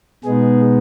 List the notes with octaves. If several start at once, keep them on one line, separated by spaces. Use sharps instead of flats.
B2 G#3 B3 D#4 G#4